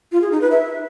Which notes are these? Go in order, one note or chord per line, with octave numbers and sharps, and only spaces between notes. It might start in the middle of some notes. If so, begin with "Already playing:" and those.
F4
G#4
D#4
B4
E5